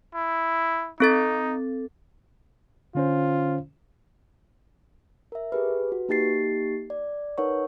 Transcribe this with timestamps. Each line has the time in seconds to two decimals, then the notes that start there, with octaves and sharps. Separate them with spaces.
0.15 E4
1.00 C4 D#4 A4 A6
2.95 D3 C#4 F4 C5
5.32 A#4 E5
5.52 G4 G#4 B4
5.92 F#4 B4
6.09 A#3 D#4 G4 A6 C7
6.90 D5
7.38 D#4 A#4 B4 C#5 F#5 C#6